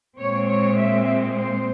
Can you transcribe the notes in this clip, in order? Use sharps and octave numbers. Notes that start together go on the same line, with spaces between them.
A#2 G#3 C4 C#5
C#5
E5
C5